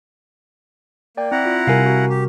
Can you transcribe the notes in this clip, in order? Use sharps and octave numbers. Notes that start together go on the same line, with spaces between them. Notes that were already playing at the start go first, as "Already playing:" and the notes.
A#3 D5 G5
C4 E4 F#5 A#5
F4
C3 G3 A#4 F5 G#5
F#4
G4